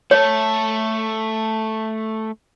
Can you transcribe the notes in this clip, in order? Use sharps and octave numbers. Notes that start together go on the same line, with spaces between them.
A3 A4 C#5